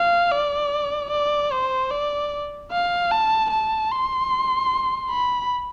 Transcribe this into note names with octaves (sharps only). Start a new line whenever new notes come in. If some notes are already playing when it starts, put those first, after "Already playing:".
Already playing: F5
D5
D5
C5
D5
F5
A5
A5
C6
B5